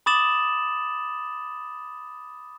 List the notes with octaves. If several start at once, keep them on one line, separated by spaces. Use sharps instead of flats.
B5 D6 D#6 A6 E7 F#7